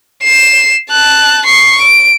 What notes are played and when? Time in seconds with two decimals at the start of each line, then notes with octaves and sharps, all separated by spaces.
0.24 C7 E7
0.91 A5 F#6
1.46 C#6 C7
1.82 D7